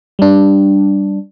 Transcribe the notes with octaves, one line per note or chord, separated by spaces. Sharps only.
G3 D4